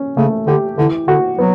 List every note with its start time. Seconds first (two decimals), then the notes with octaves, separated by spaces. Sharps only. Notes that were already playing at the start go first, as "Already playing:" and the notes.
Already playing: C#4
0.17 C#3 A3
0.47 D3 G4
0.77 D3 E3
1.08 D3 F#4
1.38 F#3 B3